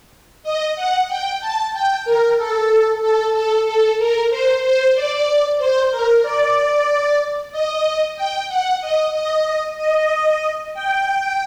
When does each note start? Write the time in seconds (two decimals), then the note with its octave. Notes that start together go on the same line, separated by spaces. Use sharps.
0.43 D#5
0.75 F#5
1.08 G5
1.40 A5
1.73 G5
2.05 A#4
2.37 A4
3.01 A4
3.34 A4
3.65 A4
3.98 A#4
4.30 C5
4.62 C5
4.95 D5
5.58 C5
5.91 A#4
6.23 D5
7.52 D#5
8.16 G5
8.48 F#5
8.81 D#5
9.13 D#5
9.77 D#5
10.74 G5